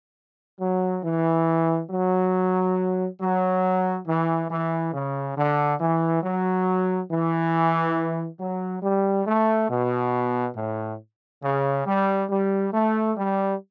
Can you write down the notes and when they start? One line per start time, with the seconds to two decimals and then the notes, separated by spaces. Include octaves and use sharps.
0.61 F#3
1.04 E3
1.90 F#3
3.20 F#3
4.07 E3
4.50 E3
4.93 C#3
5.36 D3
5.80 E3
6.23 F#3
7.11 E3
8.40 F#3
8.83 G3
9.27 A3
9.70 B2
10.57 A2
11.43 C#3
11.86 G3
12.30 G3
12.73 A3
13.16 G3